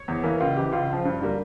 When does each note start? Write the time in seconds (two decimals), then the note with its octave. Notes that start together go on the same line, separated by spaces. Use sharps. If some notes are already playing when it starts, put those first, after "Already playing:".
Already playing: C#5
0.08 E2
0.24 E3 A#3
0.40 C#2 F4
0.56 C#3 E3 G4
0.72 C#2 F4
0.89 C#3 F3
1.05 G2
1.21 D3 G3 A#3